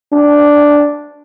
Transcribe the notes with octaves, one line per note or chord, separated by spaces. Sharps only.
D4